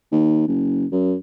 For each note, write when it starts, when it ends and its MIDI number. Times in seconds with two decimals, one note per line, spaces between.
0.12 0.46 39
0.47 0.85 30
0.92 1.14 42